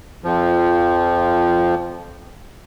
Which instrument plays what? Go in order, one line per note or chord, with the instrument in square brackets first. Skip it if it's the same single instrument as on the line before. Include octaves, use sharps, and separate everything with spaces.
[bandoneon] F2 F3